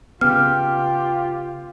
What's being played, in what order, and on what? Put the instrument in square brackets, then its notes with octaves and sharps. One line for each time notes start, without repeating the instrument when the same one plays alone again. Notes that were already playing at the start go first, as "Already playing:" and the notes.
[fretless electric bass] C#3 B3 [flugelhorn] F4 [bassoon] G4 [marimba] F6